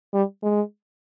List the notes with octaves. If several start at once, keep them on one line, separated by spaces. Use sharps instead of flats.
G3
G#3